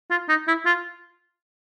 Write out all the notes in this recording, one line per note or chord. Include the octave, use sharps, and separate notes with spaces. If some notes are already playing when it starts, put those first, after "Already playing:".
F4
D#4
E4
F4